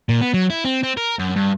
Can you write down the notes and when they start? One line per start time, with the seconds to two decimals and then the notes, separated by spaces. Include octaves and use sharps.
0.09 A#2
0.21 B3
0.34 F#3
0.50 E4
0.65 C4
0.83 C4
0.97 A#4
1.19 F#2
1.36 G2